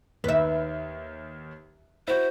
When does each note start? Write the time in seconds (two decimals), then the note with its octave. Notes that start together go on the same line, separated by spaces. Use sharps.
0.24 D#2 D#3 B4 E5
2.08 E4 F#4 C5